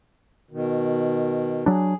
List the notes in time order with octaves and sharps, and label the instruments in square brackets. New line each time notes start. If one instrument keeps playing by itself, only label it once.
[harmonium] B2 D#3
[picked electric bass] F#3 D4 [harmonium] G#4